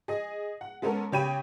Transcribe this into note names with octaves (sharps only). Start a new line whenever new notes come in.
G#4 D#5
F#5
G#3 B3 C#4 A4 A#4
C#3 G4 C#5 G5 B5 D#7